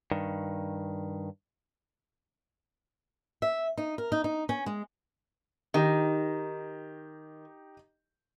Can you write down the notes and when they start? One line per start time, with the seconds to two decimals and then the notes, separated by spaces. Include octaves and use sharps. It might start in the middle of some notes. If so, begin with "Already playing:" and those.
0.11 G2 D#3
3.42 E5
3.77 D#4
3.98 A#4
4.12 D#4
4.24 D#4
4.49 C#4
4.66 G#3
5.74 D#3 D#4 G4